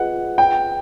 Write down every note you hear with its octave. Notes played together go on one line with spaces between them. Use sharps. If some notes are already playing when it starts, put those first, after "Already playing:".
Already playing: F4 G#4 B4 D#5 F#5
G5